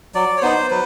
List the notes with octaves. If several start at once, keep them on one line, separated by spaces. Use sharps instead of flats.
F#3 D5
C#5
B3 D#4 C5
F#3 B4